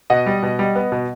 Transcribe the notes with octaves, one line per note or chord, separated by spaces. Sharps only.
B2 D#5 F#5
G3
B2
G3
B3
B2